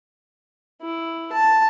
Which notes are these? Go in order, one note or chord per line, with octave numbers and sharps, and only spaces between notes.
E4
A5